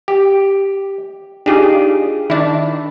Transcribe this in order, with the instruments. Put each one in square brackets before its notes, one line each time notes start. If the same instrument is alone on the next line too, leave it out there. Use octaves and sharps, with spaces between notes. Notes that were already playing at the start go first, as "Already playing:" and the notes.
[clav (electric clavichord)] G4
[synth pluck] D4 D#4 F4 [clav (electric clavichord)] G4 G#4
[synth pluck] D#3 D4 [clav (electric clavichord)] E4